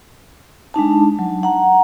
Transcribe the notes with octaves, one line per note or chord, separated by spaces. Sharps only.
G#3 D4 D#4 A5
F#3
F#5 A#5